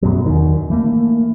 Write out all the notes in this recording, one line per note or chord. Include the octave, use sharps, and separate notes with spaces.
F#2 B2 F#3
E2 D#3
E3 A3 A#3